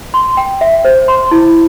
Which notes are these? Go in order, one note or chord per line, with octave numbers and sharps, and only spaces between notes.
C6
G5
E5
C5
C6
E4